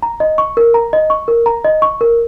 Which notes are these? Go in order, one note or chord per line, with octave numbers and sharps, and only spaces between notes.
A#5
D#5
C#6
A#4
A#5
D#5
C#6
A#4
A#5
D#5
C#6
A#4